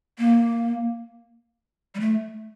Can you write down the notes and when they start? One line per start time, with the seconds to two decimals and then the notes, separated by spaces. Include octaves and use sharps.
0.19 A#3
1.95 G3
2.00 A3